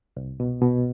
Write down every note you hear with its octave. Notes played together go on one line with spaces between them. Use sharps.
C2
B2
B2